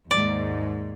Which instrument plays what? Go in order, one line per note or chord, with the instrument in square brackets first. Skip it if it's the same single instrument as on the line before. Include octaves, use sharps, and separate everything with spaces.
[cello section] D#2 G#2 [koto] D5